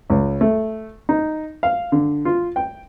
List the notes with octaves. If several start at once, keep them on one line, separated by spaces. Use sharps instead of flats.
C#2
A3
D#4
F5
D3
F4
G5